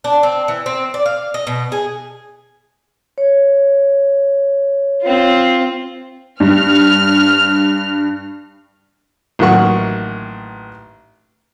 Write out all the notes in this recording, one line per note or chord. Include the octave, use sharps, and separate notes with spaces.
D4
C4
E3
C4
D5
F5
D#5
B2
G#4
C#5
C4 F4
G2 F6
A1 D#3 F#3 A#3 F#5 C#6